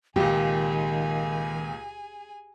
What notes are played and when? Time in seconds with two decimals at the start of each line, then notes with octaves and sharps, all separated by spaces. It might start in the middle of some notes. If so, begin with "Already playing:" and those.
0.16 C#2 A#2 D#3 G4 G#4 G#5